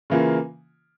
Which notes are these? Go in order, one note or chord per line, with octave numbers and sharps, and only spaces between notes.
C#3 E3 A#3 F4